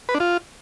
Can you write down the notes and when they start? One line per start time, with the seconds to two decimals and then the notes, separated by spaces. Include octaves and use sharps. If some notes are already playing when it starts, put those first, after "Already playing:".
0.09 B4
0.14 D4
0.20 F4